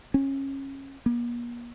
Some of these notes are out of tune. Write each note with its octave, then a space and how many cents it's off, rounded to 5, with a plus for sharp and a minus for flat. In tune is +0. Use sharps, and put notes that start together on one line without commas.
C#4 -20
A#3 +45